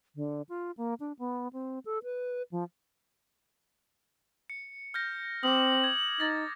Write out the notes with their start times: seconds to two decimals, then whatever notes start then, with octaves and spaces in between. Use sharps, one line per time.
0.16 D3
0.49 F4
0.77 A#3
1.00 D4
1.19 B3
1.53 C4
1.85 A4
2.03 B4
2.52 F3
4.50 C#7
4.94 F6 G6 A#6
5.43 C4 D6 D#6 F#7
5.84 G#6
6.20 D#4 A6 A#6